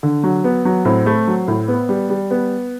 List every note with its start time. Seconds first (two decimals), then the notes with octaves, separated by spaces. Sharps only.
0.03 D3
0.24 F#3
0.44 B3
0.65 F#3
0.85 A2 C4
1.06 A3
1.27 F#3
1.48 A2
1.68 B3
1.89 G3
2.10 G3
2.31 B3